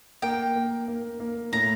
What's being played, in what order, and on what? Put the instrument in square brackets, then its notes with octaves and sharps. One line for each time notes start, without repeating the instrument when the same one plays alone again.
[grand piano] A#3 [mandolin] G5
[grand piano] A#3
A#3
A#3
[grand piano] A2 [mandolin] A#5